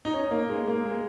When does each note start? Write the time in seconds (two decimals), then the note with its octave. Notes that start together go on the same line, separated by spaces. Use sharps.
0.05 D#4
0.14 C#4
0.31 A#3
0.49 G#3
0.67 A#3
0.85 G#3